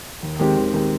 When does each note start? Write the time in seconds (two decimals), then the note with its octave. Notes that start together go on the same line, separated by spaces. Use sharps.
0.23 D#2
0.39 D#3 G#3 C4 G4
0.57 D#2
0.74 D#3 G#3 C4 G4